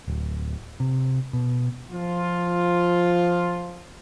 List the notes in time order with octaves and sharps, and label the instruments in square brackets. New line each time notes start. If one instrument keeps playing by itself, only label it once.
[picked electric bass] D1
C3
B2
[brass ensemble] F3 F4